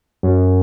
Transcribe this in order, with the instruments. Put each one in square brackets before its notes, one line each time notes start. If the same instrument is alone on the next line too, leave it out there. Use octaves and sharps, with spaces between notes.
[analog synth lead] F#2